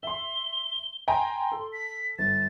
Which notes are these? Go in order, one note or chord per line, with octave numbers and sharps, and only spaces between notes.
E5 C6 G7
G5 G#5 A#5 C6
A4
B6
G1 A6